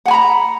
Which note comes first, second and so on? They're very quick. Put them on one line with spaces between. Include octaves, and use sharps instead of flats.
F#5 G#5 B5 A#5